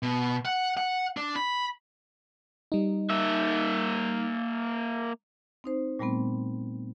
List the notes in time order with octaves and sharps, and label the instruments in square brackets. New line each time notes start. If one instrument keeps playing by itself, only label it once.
[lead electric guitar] B2
F#5
F#5
D4
B5
[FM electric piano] G3 D#4
[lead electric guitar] A#3 E5
[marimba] C4 D#4 C5
A#2 G3 A3 B3 C4